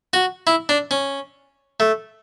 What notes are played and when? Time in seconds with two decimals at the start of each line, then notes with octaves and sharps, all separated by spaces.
0.13 F#4
0.47 E4
0.69 D4
0.91 C#4
1.80 A3